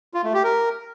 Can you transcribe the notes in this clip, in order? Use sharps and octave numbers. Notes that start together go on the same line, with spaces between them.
F4
A3
G4
A#4